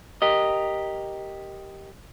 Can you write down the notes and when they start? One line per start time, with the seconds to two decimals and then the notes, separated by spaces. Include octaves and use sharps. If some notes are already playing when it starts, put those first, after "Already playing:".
0.22 G4 A#4 D#5